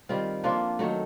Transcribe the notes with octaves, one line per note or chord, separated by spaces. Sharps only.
D#3 G3 C4 F4
F3 A#3 D4 F4
D#3 F#3 A3